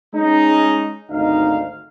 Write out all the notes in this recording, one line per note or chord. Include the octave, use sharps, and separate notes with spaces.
G#3 C#4 D#4
G#1 D2 D#4 F5